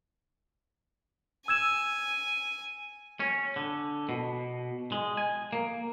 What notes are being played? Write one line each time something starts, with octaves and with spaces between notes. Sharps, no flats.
G#5 E6 G#6 E7
C#4
D3
B2
G#3
G#5
A#3